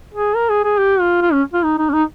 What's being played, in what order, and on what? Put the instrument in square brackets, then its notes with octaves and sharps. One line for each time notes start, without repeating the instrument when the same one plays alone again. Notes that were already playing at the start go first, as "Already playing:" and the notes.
[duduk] G#4
A#4
G#4
G#4
G4
F4
F4
C#4
F4
D#4
D#4
C#4
D#4